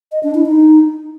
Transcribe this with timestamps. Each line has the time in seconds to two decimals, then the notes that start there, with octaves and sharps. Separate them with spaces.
0.12 D#5
0.23 D4
0.35 E4
0.46 D#4